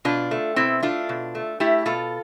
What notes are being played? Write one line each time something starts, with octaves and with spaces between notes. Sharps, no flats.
B2 D4 F4
A3
B2 C4 E4
A3 D4 F4
B2
A3
A3 E4 G4
B2 F4 A4